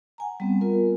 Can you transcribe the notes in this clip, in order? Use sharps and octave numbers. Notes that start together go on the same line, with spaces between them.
F#5 G#5 A#5
G3 B3 C4
B3 F4 A#4